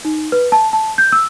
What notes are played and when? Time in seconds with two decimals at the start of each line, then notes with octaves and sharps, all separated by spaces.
0.05 D#4
0.32 B4
0.52 A5
0.73 A5
0.98 G6
1.12 E6